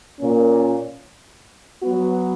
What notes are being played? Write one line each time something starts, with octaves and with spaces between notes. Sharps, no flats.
A#2 A#3 C#4
F#3 B3 F#4